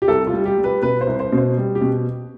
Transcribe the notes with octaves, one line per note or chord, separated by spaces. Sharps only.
G4
C2 A4
F4
G3
G4
G3
B4
B2 B4
C5
C2
C5
B2
C5
G3
G4
B2